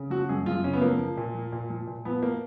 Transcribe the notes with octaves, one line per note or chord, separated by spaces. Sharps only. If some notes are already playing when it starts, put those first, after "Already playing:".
Already playing: C#3
F3 F#4
F#2 G#4
F#2 F4
C#3 C#4
B3
F3 A#3
F3
A#2
F3
A#2
F3
A#2
F3 B3
A#3